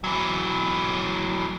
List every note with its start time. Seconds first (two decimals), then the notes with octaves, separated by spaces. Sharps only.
0.04 E3 F#3